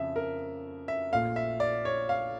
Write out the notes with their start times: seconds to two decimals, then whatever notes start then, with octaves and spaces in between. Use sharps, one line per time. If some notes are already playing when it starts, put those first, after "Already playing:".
Already playing: F2 C#3 F3 E5
0.16 A#4
0.88 E5
1.12 A#1 A#2 A3 F5
1.36 E5
1.60 D5
1.85 C#5
2.09 F5